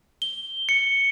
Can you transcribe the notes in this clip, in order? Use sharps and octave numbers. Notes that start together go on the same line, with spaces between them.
G7
C#7